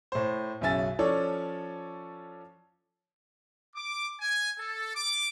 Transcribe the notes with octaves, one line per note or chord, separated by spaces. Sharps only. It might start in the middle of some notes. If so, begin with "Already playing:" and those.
A2 C5
B1 F#2 C#3 E5 G#5 A6
F3 C#4 A4 C#5 D5
D6
G#5
A4
D6